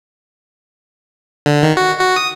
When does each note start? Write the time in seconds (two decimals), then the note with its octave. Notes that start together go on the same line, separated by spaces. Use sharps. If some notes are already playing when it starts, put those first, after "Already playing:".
1.46 D3
1.63 D#3
1.77 F#4
1.99 F#4
2.16 D#6